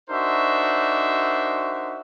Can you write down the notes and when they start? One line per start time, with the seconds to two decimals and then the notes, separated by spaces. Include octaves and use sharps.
0.10 D4 D#4 F#4 A#4 C5 E5